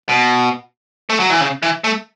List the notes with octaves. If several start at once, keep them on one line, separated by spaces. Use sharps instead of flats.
B2
A3
F#3
E3
C#3
E3
A3